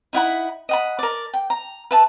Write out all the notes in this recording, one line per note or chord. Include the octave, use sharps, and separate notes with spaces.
D#4 E4 F#5 B5
D#5 F#5 B5
A#4 D5
G5
A#5
B4 E5 A5